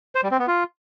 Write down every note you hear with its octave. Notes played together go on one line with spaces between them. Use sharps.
C5
G3
C4
B3
F4